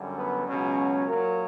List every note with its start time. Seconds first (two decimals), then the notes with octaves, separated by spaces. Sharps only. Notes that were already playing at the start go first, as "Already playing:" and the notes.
Already playing: F#2 D3 G3
0.16 B3
0.46 C#2 B2 F#3 C#4
1.06 A#2 F#3 A#4